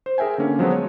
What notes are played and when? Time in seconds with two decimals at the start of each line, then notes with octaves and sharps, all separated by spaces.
0.06 C5
0.18 G#4 A#4 E5 G5 G#5
0.38 D3 A#3 C#4
0.59 F3 F#3 G#3 B3
0.72 C#5